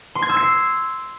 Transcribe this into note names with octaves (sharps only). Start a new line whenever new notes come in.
C6
G#6
E6
C7